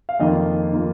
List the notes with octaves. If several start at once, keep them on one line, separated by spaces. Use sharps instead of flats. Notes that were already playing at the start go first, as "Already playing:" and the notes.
F5
F2 D#3 A#3 F4 D#5
D#3 A#3 F4